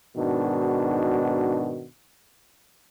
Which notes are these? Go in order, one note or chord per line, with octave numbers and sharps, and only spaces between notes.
G#2 B2 D#3 D4 F#4